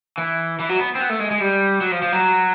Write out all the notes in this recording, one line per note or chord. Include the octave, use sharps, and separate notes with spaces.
E3
E3
F#3
B3
C4
B3
A3
G#3
G#3
G3
F#3
F3
F3
F#3